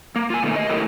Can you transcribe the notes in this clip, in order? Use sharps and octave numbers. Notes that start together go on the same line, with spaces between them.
A#3
F4 G#5
B2 D#3 A3
G4 D#5
A3 E4 G4 A4 A#4